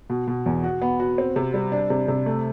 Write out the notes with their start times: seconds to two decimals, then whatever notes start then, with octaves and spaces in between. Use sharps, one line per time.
0.10 B2
0.28 B2
0.46 E2
0.64 F#4
0.81 B3
1.00 F#4
1.18 C4
1.36 C3
1.54 G3
1.72 D4
1.90 C3
2.08 C3
2.26 A3